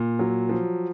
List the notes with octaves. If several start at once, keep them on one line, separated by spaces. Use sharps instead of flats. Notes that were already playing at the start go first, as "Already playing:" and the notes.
Already playing: A#2
F#3
F3